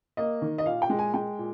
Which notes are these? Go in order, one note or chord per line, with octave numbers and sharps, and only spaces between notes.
A#3 D#5
D#3
D#5
A#2 F5
G5
G#3
G#5
G#3 G5
A#2